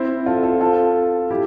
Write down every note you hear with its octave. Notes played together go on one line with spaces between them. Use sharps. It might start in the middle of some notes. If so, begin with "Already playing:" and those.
Already playing: C4 E4
F4 A4
F4 A4
F4 A4
E4 G4